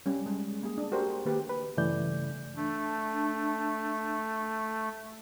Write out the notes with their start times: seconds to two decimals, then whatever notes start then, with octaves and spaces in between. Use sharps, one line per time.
0.06 G3 C#4
0.26 G#3
0.63 A#3 G#4
0.78 D4
0.92 F#4 G4 A#4 C5
1.25 D#3 A#3 G4 B4
1.49 B4
1.77 G2 C#3 E3 A3 D5 G6
2.56 A3 D4